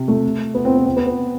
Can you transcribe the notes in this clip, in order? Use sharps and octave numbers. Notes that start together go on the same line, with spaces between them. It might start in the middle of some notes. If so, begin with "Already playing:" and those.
Already playing: C3
A3
B3
C4
B3
C4
B3
B3